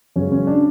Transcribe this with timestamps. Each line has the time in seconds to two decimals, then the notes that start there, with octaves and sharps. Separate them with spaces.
0.16 F#2 C#3 G#3 C#4
0.32 C#4
0.47 D4